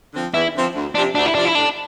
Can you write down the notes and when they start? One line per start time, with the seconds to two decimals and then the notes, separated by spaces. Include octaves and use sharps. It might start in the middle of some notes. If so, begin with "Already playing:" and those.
0.14 D3 F3 C4
0.33 E2 E4
0.54 D3 F3 C4
0.75 D2
0.95 F3 D4
0.98 C3
1.15 D2 D4
1.26 E4
1.35 C3 F3 D4
1.45 E4
1.55 A2 D4